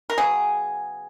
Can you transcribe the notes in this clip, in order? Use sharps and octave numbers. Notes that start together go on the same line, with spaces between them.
A#4
C#3 F#3 B3 G#4